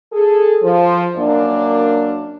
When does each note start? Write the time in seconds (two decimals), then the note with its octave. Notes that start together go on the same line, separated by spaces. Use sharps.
0.12 G#4 A4
0.62 F3
1.17 F#2 A#3 D4